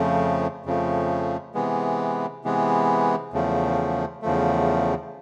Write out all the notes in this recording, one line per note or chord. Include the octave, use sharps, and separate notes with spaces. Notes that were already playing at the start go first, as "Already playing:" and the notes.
Already playing: F2 C#3 F3 A3
F2 C#3 F3 A3
C3 E3 G#3 B3
C3 E3 G#3 B3
E2 C#3 F3 A3
E2 C#3 F3 A3